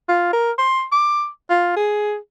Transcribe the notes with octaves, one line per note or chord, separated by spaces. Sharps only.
F4
A#4
C6
D6
F4
G#4